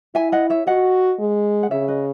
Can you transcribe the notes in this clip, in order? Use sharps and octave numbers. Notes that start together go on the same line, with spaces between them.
E4 E5 G#5
D#5 F#5
C#5 E5
F#4 D#5 F#5
G#3
F#5
C#3 C#5 E5
B4 D#5